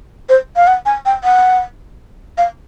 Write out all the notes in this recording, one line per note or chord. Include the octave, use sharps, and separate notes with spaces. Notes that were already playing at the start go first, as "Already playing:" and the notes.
C5
F5
F#5
G#5
G5
F#5
F5